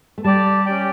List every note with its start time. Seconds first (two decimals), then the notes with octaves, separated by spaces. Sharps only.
0.18 A3
0.24 G3 G4 D5 A5
0.66 C#4 G4 D5 G5